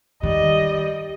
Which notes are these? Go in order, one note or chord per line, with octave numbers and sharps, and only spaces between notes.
D#3 G3 D#5